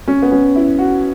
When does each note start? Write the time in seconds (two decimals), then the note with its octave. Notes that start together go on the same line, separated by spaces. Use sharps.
0.08 C#4
0.22 B3
0.32 C#4
0.56 E4
0.79 F#4